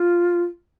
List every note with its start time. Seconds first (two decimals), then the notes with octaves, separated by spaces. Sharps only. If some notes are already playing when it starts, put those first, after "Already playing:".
Already playing: F4